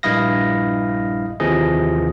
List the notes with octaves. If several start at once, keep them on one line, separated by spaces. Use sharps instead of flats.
A#1 G2 E4 D#5 F5 A#6
D#2 C3 E3 F3 G#4 D#5